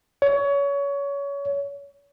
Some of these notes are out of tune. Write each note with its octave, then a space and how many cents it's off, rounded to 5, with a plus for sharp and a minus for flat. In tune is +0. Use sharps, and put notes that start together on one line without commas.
C#5 +25